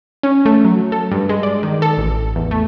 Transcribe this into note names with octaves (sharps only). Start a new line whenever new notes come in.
C#4
A3
F#3
A4
G2
G#3
D5
D#3
A4
A1
E2
A3